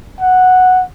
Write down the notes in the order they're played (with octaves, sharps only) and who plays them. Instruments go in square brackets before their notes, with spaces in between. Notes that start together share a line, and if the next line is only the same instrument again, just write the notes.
[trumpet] F#5